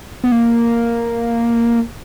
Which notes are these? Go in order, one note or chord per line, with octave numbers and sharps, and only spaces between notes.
B3
A#3